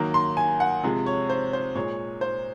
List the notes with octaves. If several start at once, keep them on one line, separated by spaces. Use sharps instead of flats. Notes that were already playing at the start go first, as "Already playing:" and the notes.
Already playing: D#3 F#3 A#3
C6
G#5
F#5
C3 F3 G#3
C#5
C5
C5
A#2 G#3 C#5
C5